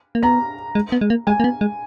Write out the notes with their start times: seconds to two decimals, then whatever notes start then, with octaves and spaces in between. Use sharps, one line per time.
0.15 A#3
0.23 B3 A#5
0.75 G#3
0.92 B3
1.01 G#3
1.10 A#3
1.27 G#3 G#5
1.40 A#3
1.44 B3
1.61 G#3